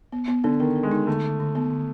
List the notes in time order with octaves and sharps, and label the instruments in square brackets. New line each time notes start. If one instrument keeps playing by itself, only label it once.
[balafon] B3
B3
[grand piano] D3 [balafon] B3
[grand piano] D#3 [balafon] B3
[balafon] B3
[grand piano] G#3
[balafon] D#4
[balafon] D3 [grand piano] A3
[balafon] D3
D3
B3
D3